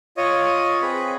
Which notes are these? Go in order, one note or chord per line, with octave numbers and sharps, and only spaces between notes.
F4 C#5 D#5
C4 G#4 B4 B5